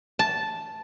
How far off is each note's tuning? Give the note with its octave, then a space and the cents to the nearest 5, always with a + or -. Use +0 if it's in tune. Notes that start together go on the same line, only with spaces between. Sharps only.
A5 -5